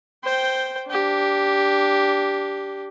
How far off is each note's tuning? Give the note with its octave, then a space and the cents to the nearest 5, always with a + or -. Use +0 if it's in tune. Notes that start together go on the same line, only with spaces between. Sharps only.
C5 +0 G5 -5
D4 -15 G4 +0